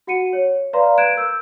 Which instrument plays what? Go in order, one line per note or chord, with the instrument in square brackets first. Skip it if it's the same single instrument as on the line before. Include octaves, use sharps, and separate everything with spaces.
[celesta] F#4 F#5 C#7 D#7
C#5
B4 D5 F5 A#5 C6
F#6 G#6 D7 E7
A#4 E6 G6